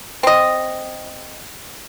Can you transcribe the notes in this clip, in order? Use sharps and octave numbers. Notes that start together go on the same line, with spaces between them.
C4 D#5